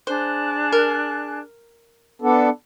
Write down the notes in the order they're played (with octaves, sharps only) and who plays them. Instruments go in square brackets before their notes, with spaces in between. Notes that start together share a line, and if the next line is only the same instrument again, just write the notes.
[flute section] D4 G#4 F#6 [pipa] C5
[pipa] A#4
[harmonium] B3 D4 A4 [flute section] F#5